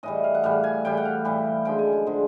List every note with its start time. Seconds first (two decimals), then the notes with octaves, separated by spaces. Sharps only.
0.03 A2 E3 G3 D#5
0.24 F5
0.34 F#5
0.43 A2 E3 G3 F5
0.64 G#5
0.85 A2 E3 G3 G5
0.97 F#5
1.05 F5
1.25 A2 E3 G3
1.65 F#2 D3 F3 G#3 G5
1.79 G#5
1.92 G#5
2.06 D3 F3 G#3